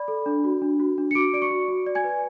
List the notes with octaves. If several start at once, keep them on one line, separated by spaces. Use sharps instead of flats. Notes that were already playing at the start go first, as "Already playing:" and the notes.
Already playing: D5 B5
A4
D4
F#4
D4
F#4
D4
C#7
F#4 D6 D7
D5 D7
C#6 C#7
F#4
F#4
D5
G#5 G#6
B4